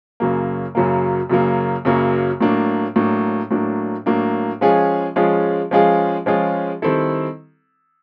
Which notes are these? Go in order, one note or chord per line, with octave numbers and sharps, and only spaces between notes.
F#2 C#3 F#3 A#3
F#2 C#3 F#3 A#3
F#2 C#3 F#3 A#3
F#2 C#3 F#3 A#3
A2 F#3 A#3 D4
A2 F#3 A#3 D4
A2 F#3 A#3 D4
A2 F#3 A#3 D4
F3 G#3 C#4 F4 G#4
F3 G#3 C#4 F4 G#4
F3 G#3 C#4 F4 G#4
F3 G#3 C#4 F4 G#4
D#3 G3 C4 E4 A4